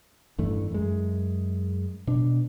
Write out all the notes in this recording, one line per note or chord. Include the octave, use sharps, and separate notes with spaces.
A1 G2 E3 A3
F#2 G#3
B2 D4